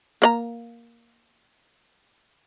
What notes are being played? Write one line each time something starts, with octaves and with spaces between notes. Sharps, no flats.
A#3 D5 A#5